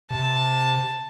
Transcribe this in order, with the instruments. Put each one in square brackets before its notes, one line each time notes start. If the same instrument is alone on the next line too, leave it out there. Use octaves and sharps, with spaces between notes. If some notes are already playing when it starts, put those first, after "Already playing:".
[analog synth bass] C3 [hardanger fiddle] A5